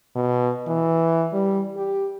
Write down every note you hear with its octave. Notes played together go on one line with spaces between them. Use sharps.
B2
E3
G3
G4